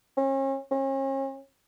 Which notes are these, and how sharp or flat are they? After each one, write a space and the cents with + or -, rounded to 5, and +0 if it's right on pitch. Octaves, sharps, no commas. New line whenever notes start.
C#4 -40
C#4 -40